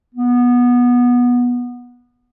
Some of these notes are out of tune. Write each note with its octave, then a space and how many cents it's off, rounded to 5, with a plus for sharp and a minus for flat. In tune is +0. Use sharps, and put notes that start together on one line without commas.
B3 -15